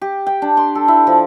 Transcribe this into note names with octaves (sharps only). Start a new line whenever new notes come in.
G4
G5
D4
C6
A4
E4
F3